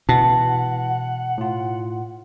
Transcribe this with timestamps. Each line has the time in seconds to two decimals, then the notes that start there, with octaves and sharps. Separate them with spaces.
0.09 B2 E3 F#5 A5
1.38 A2 F4